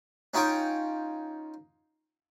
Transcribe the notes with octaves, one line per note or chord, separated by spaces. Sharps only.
C#4 D#4 F4 C#5 G5